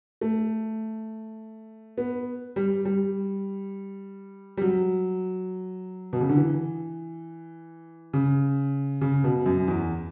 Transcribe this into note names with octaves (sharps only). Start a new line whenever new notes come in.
A3
B3
G3
G3
G3
F#3
B2
C#3
D3
E3
C#3
C#3
B2
F#2
E2